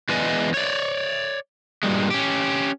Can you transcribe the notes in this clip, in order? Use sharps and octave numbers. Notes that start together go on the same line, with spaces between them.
E2 G#3 B4 D5 D#5 G#5
C#5 D5
G2 A#2 G3 G#3
C#4 G4